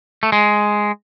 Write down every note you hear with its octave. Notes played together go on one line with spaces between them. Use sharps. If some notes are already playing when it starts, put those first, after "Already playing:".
A3
G#3